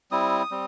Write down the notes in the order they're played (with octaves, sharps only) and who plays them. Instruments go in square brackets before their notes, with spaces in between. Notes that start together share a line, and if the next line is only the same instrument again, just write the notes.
[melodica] G3 C4 E4 D#6
G3 C4